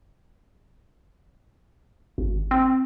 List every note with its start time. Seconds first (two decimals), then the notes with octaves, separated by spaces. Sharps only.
2.18 G#1
2.51 C4